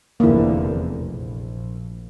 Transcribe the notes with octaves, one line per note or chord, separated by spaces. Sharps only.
F1 E2 D3 A#3 E4
A#1